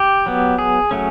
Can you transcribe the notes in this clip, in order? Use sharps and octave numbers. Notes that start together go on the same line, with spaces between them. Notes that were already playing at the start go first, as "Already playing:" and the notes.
Already playing: G4
F#3 B3
G#4
F#3 A3 C#4